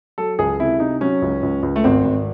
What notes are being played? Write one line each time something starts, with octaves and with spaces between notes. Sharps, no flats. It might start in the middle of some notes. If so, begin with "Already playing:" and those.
F#3 A4
C#2 G#4
C3 E4
C3 D#4
F#3 C#4
C#2
C#2
C#2
A3
G#1 C4
G#1